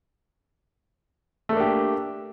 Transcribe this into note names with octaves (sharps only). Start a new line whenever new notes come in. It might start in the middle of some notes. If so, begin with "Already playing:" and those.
A3 A#3 D4 G4